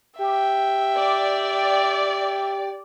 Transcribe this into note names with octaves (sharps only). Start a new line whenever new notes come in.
G4 E5 G5
D5